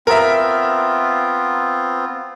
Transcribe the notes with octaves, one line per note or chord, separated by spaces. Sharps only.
B3 C4 F4 A#4 E5